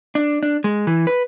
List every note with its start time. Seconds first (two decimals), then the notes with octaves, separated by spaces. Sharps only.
0.15 D4
0.43 D4
0.64 G#3
0.87 E3
1.07 B4